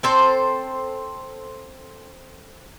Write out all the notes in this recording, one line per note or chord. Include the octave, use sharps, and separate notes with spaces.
C4 A4 C5